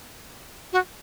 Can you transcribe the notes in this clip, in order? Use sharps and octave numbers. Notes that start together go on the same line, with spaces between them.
F#4